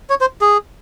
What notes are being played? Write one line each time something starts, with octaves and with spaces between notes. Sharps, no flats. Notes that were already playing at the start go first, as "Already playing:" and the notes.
C#5
C5
G#4